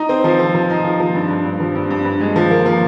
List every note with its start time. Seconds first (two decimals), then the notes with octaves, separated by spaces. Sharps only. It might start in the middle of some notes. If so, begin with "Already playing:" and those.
Already playing: D#4
0.09 C4
0.24 F3
0.39 F3
0.55 F3
0.70 D#4
0.84 F3
1.00 F3
1.15 G2
1.30 G2
1.45 G2
1.60 F3
1.75 G2
1.91 G2
2.05 G2
2.20 G#3
2.36 F3
2.51 A#3
2.66 F3